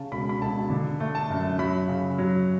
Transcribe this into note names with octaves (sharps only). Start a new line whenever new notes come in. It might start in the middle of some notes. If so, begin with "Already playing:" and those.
Already playing: C#3 A5
E1 B5
B5
E1 A5
D3
A3
A5
F#2
F#3 B5
C#3
F#3